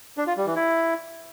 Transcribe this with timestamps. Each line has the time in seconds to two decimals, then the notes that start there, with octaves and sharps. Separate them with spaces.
0.18 D4
0.27 F4
0.37 G3
0.46 E3
0.56 E4